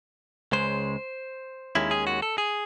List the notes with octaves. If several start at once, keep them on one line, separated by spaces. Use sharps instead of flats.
C#2 C#3 G#3 C5
D#2 D#3 G#3 C#4 E4
G#4
F#4
A4
G#4